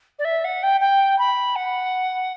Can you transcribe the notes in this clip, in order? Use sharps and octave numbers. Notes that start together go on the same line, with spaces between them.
D5
E5
F#5
G5
G5
B5
F#5